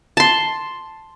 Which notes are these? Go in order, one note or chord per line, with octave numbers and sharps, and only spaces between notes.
A5 C6